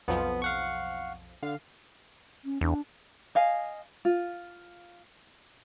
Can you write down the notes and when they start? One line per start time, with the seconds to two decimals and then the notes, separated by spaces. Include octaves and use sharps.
0.08 B1 F2 F3 B3
0.42 F5 F#5 C#6
1.43 D3 F5
2.44 C#4
2.61 E2 D4
3.35 D#5 F5 G#5
4.05 F4